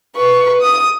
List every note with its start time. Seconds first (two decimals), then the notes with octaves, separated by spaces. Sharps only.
0.16 B4 C#6
0.61 D#6